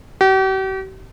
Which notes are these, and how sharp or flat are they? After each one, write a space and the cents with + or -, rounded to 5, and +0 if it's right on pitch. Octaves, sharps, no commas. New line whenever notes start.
G4 -45